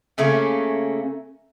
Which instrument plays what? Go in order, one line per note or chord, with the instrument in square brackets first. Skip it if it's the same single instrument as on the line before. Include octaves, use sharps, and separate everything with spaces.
[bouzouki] C#3 A3 A#3 C#4